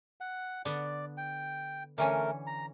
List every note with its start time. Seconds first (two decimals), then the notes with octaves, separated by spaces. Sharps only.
0.21 F#5
0.65 D3 B3 D5
1.17 G5
1.98 D3 E3 A3 C#4 A#4
2.47 A#5